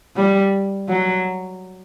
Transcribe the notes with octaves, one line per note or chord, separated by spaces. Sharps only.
G3
F#3